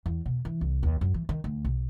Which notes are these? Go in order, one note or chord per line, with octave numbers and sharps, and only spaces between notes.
E2
B2
E3
C2
D#2
F#2
E3
D#3
D2
B1